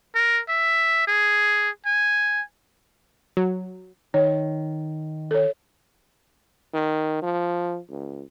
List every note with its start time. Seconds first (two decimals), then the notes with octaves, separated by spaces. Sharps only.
0.15 A#4
0.49 E5
1.07 G#4
1.86 G#5
3.37 F#3
4.14 D#3 C#5
5.31 A4 C#5
6.73 D#3
7.22 F3
7.90 C#2